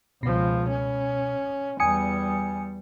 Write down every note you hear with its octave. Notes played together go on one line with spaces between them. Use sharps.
C#2 B2 F3
C#4
E2 G3 G#5 D#6 C#7